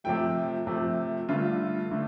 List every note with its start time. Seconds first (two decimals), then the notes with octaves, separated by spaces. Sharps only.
0.04 C3 F3 A3 G5
0.67 C3 F3 A3
1.28 G2 D3 A3 F4
1.91 D3 A3